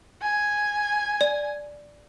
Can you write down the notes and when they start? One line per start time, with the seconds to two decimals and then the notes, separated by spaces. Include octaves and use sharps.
0.22 G#5
1.21 D5